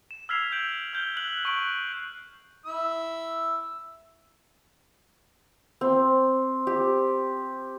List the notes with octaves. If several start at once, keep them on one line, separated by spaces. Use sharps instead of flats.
E7
E6 F6 G#6 B6 C7 F7
G6 D7 F#7
F6 G6 G7
F#6 F#7
C#6 F#6 D7 F#7
E4 E6
C4
G4